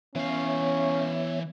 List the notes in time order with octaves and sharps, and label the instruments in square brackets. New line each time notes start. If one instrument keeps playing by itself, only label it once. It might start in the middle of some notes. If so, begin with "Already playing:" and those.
[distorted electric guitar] E3 F5 [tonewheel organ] B3 C#5 E5 [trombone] C#4